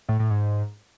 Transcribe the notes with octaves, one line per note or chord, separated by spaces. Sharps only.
A2
A2
G#2